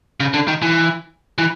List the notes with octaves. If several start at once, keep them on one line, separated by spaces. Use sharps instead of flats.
C#3
D3
D#3
E3
E3